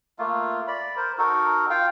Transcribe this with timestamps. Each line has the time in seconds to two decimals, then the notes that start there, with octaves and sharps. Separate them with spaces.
0.19 A3 A#3 F4
0.68 D5 B5
0.96 A#4 C5
1.18 D#4 F#4 A4 A#4
1.70 F4 F5 G5